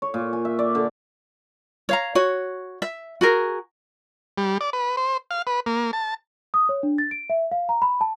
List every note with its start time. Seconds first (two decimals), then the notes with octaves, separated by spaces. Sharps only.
0.02 C#5
0.14 A#2
0.33 G#5
0.45 E5
0.59 D5
0.75 D3
1.89 C#5 F5 A#5
2.15 F#4 C#5
2.82 E5
3.21 F#4 G#4 A#4
4.38 G3
4.61 D5
4.73 B4
4.97 C5
5.31 F5
5.47 B4
5.66 A#3
5.93 A5
6.54 D#6
6.69 C#5
6.83 D4
6.98 A6
7.11 D7
7.30 E5
7.52 F5
7.69 A#5
7.82 B5
8.01 A5